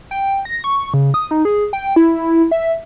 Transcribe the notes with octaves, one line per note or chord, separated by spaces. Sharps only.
G5
A#6
C#6
C#3
D#6
D#4
G#4
G5
E4
E5